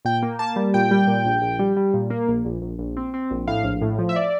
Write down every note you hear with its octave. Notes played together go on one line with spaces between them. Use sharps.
A#2 G5
A#3
A#3 A5
G3
A#2 G5
G3
A#2
A#1
A#1
G3
G3
A#2
A#3
A#1
A#1
A#1
A#1
C4
C4
A#1
A2 F5
A#1
A2
F3
E5
D5